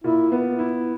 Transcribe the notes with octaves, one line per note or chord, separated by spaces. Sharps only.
A#2 E4
B3
E4